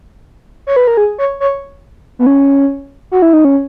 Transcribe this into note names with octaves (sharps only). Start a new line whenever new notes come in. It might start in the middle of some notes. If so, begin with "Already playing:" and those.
C#5
B4
A#4
G#4
C#5
C#5
B3
C#4
F#4
E4
D#4
C#4